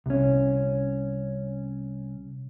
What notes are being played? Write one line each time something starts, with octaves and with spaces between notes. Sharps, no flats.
C2 C#4